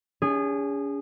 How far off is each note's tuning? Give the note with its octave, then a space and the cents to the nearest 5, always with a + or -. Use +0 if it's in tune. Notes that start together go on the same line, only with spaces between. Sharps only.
C#4 +40 G#4 -25